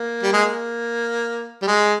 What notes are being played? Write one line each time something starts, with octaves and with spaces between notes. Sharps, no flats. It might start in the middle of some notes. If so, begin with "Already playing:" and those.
Already playing: A#3
G3
G#3
A#3
G3
G#3